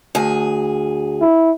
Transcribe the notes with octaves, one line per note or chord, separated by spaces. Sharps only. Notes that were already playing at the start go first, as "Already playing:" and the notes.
D2 G#4
E4